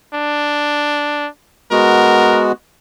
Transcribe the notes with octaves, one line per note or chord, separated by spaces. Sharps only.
D4
G#3 B3 F#4 A#4